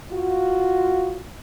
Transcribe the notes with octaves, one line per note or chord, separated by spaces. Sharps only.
F4 F#4